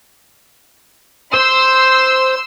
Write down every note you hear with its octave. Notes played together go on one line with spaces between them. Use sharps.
C5 C6 E6